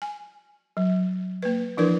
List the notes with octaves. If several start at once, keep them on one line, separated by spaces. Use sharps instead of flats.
G#5
F#3
A#3 B4
E3 F3 D4 E4 A#4 B4